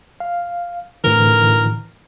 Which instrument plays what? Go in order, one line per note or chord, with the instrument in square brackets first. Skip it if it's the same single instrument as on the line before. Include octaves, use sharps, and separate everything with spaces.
[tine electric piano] F5
[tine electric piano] A2 D3 E3 [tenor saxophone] A#4